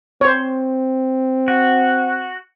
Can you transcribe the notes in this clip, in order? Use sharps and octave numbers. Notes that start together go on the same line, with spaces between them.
C4 C5 C#5
F#4